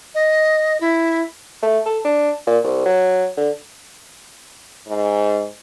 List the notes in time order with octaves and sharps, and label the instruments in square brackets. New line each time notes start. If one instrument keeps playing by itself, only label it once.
[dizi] D#5
E4
[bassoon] A3
A4
D4
A#2
C2
F#3
D3
[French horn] G#2